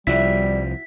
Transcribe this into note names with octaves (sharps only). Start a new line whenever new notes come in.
C2 F3 G3 E4 F#4 B6